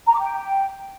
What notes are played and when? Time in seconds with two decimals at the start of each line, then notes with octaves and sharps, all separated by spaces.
0.07 A#5
0.14 D6
0.20 G5